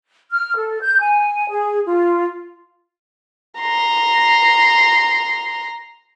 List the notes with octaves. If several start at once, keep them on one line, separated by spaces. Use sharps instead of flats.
F6
A4
G6
G#5
G#4
F4
A#5 C6